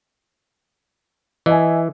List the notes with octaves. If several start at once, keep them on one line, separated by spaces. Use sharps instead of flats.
E3 D#5 E5 G#5